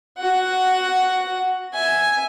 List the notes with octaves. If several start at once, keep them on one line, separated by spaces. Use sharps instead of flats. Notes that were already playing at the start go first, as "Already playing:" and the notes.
F#4 F#5
E5 G#5